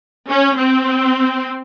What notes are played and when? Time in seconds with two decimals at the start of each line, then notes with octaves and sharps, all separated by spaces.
0.29 C#4
0.57 C4